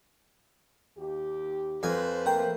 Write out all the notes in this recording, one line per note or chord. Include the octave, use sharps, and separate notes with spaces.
D#2 G4
F2 B4 C5 G#5
A3 A#3 A4 A#4 G5